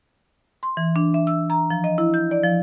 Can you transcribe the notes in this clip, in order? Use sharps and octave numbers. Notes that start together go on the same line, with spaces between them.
C6
E3
D4
E5
E6
A#5
F3
D#5
E4
G6
D5
F3